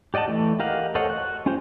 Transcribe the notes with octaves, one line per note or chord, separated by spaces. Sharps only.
G4 D5 D#5 F#5 A5
E3 A3
G4 A#4 D#5 F5 F#5
A4 C5 C#5 D#5 F#5
F#4 F#6
C#4 F4 G4 C5